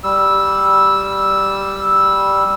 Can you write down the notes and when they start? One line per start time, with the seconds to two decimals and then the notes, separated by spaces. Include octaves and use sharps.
0.04 G3 E6